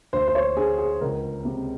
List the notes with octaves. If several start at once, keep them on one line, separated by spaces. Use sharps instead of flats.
D2 C5
C5
C#5
D3 G#4
G#4
C#2 A#4
C3